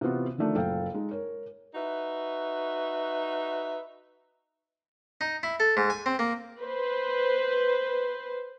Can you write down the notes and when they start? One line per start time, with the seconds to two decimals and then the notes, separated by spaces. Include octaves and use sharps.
0.01 C3 E3 B3 F4 F#4
0.38 D3 D#3 F3 A3 D4
0.55 F#1 A#2 A4 F5 G5
0.94 G#3 D#4
1.11 A#4 C#5
1.74 D#4 F#4 B4 E5
5.21 D#4
5.43 E4
5.60 A4
5.77 G#2
5.90 G#5
6.06 C4
6.19 A#3
6.59 B4 C5